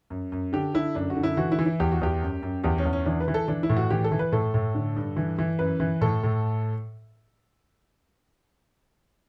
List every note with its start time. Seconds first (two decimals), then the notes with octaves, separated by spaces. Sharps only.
0.10 F#2
0.32 F#2
0.53 D3 G4
0.74 D3 E4
0.95 F#2 D4
1.10 F#4
1.17 D3
1.23 E4
1.37 E3 F#4
1.52 E4
1.59 E3
1.66 E4
1.80 E2 G4
1.92 F#4
2.01 E2 G4
2.22 F#2
2.43 F#2
2.64 E2 G4
2.78 C#4
2.85 E2
2.93 C#4
3.06 E3 D4
3.20 B4
3.28 E3
3.34 A4
3.48 E3 D4
3.63 E4
3.69 A2
3.77 F#4
3.90 E3 G4
4.04 A4
4.12 E3
4.19 B4
4.32 A2 A4
4.54 A2
4.75 D3
4.96 G2
5.17 E3
5.38 E3
5.59 F#2 B4
5.80 E3
6.01 A2 A4
6.23 A2